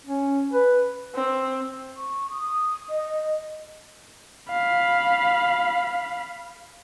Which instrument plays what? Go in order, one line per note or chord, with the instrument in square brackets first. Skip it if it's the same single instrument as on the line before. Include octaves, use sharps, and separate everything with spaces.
[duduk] C#4
B4
[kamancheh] C4
[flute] C#6
D#6
D#5
[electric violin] F5 B5